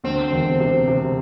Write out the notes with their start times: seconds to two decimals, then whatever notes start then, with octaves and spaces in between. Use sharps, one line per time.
0.04 D2 C4
0.32 E1
0.60 C3
0.88 C3